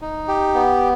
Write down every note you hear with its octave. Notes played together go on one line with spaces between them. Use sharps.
D#4
G4
B3